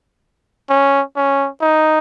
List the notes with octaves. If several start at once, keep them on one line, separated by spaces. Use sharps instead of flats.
C#4
C#4
D#4